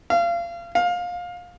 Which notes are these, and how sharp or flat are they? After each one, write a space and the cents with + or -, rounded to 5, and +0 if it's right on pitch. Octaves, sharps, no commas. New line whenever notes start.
F5 -30
F5 +20